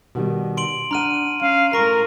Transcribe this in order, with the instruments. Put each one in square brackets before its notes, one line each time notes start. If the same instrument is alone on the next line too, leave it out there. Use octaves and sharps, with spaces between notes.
[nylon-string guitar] B2 D#3 G3
[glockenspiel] C6 D7 F#7
[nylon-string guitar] D4 F#5 [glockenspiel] A#5 F6 D#7
[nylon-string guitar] C#4 [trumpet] F5
[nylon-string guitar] A2 F5 [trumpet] A#4 [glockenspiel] A#5 C#6